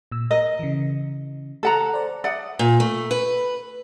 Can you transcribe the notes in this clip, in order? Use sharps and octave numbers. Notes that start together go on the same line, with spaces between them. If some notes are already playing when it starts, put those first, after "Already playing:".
A#2 E6
A#4 D#5
C#3 E3
A4 F#5 A#5
C5 D5
D5 E5 F#5 D#6
A#2
A3
B4